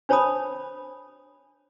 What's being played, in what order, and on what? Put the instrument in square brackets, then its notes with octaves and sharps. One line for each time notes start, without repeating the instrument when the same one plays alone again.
[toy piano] D4 C5 C#5 A5 B5 D#6